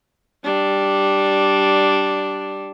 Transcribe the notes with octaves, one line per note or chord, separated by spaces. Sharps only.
G3 D4